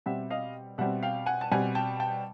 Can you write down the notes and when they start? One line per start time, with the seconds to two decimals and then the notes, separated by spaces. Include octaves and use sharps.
0.06 B2 G3 C4 E5 F#5
0.31 D#5 F5
0.78 B2 G3 C4 E5 F#5
1.03 F5 G5
1.26 F#5 G#5
1.41 A5
1.51 B2 G3 C4 F#5 G#5
1.75 G5 A5
2.00 G5 A5